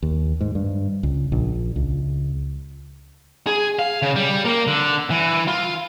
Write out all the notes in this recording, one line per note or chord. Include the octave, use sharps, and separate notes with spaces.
D#2
G#2
G2
C#2
A#1
C#2
G#4
F5
C#3
G3
A#3
D3
E3
F4